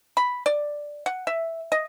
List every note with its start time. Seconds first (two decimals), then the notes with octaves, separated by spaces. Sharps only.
0.17 B5
0.46 D5
1.06 F#5
1.27 E5
1.72 D#5